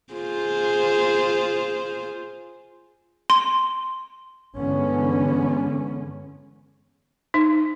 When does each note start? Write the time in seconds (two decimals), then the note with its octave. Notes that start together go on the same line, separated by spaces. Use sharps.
0.13 F4 G#4 C5
3.30 C6
4.55 G2 D3 E3 G#3 B3 C#4
7.34 D#4